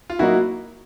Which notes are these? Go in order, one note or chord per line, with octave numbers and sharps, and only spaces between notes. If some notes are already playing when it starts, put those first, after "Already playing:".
F4
F#3 A#3 D#4 E4 F#4